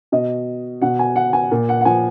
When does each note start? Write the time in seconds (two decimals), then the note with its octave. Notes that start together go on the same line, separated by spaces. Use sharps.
0.12 B2 D#5
0.82 B2 F#5
0.99 G#5
1.16 F#5
1.33 G#5
1.51 A#2
1.69 F#5
1.81 F#5
1.85 F3 G#5